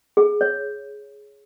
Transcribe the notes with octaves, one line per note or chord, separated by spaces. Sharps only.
G#4
C#5